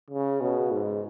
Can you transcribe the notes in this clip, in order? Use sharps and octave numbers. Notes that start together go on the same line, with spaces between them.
C#3
B2
G#2